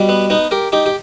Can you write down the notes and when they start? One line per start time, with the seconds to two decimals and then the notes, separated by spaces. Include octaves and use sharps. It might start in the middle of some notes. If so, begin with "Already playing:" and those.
Already playing: B2 G3
0.09 B3
0.30 B3 D#4
0.51 G4 A#4
0.72 D#4 G4
0.86 G4